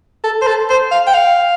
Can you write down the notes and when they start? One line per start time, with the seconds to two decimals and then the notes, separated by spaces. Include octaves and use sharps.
0.24 A4
0.42 C5
0.47 A4
0.70 C5
0.91 F5
1.07 G5
1.14 F5